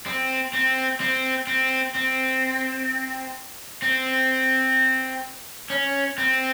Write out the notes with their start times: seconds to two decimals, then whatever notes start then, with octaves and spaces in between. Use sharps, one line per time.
0.06 C4
0.53 C4
1.00 C4
1.47 C4
1.95 C4
3.82 C4
5.70 C#4
6.18 C4